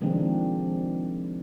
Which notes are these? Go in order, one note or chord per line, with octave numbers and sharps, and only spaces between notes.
C3 D#3 F3 G#3 C4 D4